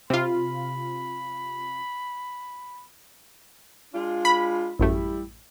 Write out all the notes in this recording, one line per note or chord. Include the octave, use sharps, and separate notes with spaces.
C3 F4 B5
G#3 D4 F4
B5
A1 F#2 G3 A3 E4